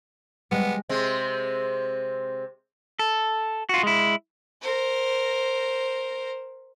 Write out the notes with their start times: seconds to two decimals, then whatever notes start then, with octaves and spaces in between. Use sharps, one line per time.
0.51 G3 G#3 B3
0.89 C3 G#3 C4
2.99 A4
3.69 F4 F#4
3.83 G#3 E4
4.62 A#4 C5